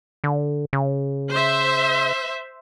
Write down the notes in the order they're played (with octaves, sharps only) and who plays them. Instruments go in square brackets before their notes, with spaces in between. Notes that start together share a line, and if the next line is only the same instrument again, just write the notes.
[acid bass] D3
C#3
[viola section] C5 E5